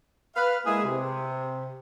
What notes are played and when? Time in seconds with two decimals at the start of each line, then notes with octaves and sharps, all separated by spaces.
0.36 B4 F5
0.65 G#3 A#3 E4 G#4
0.84 C3